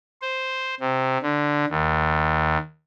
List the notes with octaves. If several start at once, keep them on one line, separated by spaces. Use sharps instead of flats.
C5
C3
D3
D#2